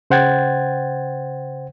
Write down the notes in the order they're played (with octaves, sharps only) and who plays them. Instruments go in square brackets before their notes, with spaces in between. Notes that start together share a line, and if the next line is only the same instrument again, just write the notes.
[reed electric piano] C#3 C5 F#5 G5 G#6 A6